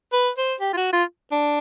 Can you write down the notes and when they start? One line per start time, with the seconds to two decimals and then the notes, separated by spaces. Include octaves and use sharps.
0.13 B4
0.38 C5
0.60 G4
0.73 F4
0.77 F#4
0.93 F4
1.32 D4